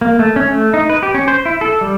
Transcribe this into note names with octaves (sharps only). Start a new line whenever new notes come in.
A#3
A3
C#4
A3
D#4
B4
G4
C#4
C5
E4
A4
G3